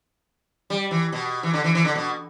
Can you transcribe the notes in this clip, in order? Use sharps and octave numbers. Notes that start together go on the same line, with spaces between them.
G3
E3
B2
E3
D3
E3
E3
D3
B2